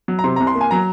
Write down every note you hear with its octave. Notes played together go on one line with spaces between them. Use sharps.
F#3
A#5
C3 C6
C2 A#5
C6
A#3
G#5
F#3 A#5